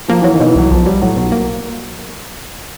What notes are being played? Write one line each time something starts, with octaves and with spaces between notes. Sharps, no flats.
F3 A#3
E3 F#3
D#3
B2
E3
C2 F#3
B1 F3
F#3 G3
A2 F#3
B1
A#3